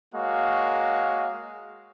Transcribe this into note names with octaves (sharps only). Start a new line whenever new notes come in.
G#3 A#3 F#4 C#5 F5